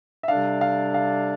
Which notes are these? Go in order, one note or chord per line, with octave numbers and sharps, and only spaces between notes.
E5
C3 G3 D4 A4 D5 F5
F5
F5